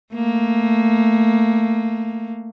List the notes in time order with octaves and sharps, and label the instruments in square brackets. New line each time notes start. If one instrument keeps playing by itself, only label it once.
[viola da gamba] A3 A#3